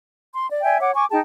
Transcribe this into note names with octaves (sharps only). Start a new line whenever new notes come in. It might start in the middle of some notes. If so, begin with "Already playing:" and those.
C6
D5
D5 E5 G5 G#5
C#5 F#5 D6
G#5 C#6 D6
D#4 G#4 G5 A5